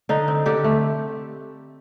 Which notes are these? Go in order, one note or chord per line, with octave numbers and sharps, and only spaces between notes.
D3 D#4
C4
D3 G4
A3